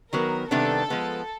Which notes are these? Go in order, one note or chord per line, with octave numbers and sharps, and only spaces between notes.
D#3 F#3 B3 A#4
C3 D#3 G3 B3 D4 A4
F3 G#3 B3